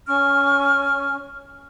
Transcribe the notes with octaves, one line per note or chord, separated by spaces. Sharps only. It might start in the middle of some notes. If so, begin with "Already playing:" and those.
C#4 G#5 C#6 F6